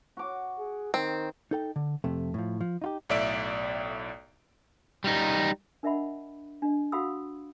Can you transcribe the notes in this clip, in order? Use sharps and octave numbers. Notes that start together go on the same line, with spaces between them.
F#4 D6
G#4
D#3 C4
D#4 A4 G5
D3
F2 C3 A3
A2 F3
F3
D#4 F4 G4
B1 A2 D5 E5 D7
G3 D#4
D4 A#4 D#5 E5 F#5 B5
D4 D#5
F#4 F5 F#5 B5 D#6 E6